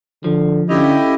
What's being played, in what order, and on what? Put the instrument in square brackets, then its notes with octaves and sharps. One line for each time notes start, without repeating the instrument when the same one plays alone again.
[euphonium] D3 [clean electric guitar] F3
[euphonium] D3 [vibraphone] C#4 A4 F5 [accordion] E4 G4 D#5